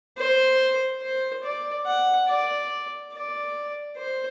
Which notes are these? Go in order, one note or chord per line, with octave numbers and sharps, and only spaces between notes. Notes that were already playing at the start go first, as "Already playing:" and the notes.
C5
C5
D5
F#5
D5
D5
C5